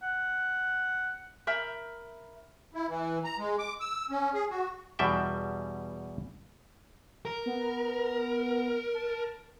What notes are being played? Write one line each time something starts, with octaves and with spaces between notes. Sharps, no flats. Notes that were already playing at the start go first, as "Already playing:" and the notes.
F#5
A#4 E5 B5 G6
E4
E3
A#5
G#3
D6
E6
C#4
G#4
F#4
E2 B2 E3 G3 E5 G5
A#4
B3
A5